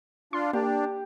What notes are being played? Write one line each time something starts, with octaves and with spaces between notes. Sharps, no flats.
D4 F4 C6
A#3 D4 G4